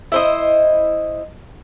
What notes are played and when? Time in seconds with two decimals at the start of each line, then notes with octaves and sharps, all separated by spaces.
0.12 E4 C5 D#5